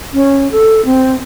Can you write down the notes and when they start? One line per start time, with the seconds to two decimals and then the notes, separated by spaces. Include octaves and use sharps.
0.13 C#4
0.52 A4
0.85 C4